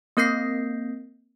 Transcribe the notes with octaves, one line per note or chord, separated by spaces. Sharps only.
A#3 C4 A#4 G6 A#6 C7